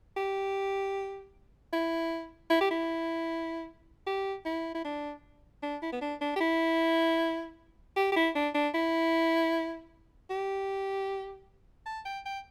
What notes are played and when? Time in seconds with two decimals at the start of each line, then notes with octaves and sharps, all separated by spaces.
0.17 G4
1.73 E4
2.50 E4
2.61 G4
2.71 E4
4.07 G4
4.46 E4
4.74 E4
4.85 D4
5.63 D4
5.82 E4
5.93 B3
6.01 D4
6.21 D4
6.36 G4
6.41 E4
7.96 G4
8.12 G4
8.16 E4
8.35 D4
8.55 D4
8.74 E4
10.30 G4
11.86 A5
12.05 G5
12.25 G5